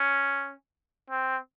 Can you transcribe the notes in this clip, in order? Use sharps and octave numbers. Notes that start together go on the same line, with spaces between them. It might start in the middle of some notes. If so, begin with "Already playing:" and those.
Already playing: C#4
C4